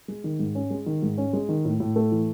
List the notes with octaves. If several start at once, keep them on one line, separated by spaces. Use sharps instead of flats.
G#3
D#3
G#2
C#4
G#3
D#3
G#2
C#4
G#3
D#3
A2
A2
A3
E3